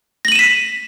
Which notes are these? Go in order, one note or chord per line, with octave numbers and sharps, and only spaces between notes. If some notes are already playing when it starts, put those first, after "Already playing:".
A#6 B6 D#7 E7 F#7